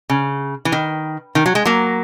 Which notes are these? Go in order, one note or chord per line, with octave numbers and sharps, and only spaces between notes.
C#3
E3
D#3
D#3
F#3
G#3
F#3 A#3